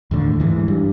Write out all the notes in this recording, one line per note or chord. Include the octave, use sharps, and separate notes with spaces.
D#2 A2 D3
G#2 E3
G2